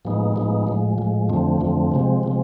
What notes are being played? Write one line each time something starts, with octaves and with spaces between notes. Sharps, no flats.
A2 F3 G#3 B3 D#4
A2 F3 G#3 B3 D#4
A2 F3 G#3
A2 F3 G#3
F2 D3 F3 A3 C4
F2 D3 F3 A3 C4
C3 F3 G#3 C4
C3 F3 G#3 C4